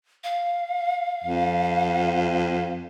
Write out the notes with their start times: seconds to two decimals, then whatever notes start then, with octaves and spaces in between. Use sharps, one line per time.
0.24 F5
1.24 F2